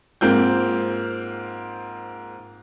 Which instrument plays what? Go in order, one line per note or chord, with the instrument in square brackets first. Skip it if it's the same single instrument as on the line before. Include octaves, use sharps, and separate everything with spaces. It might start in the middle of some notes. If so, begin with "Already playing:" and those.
[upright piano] G#2 A#3 C4 F4 G6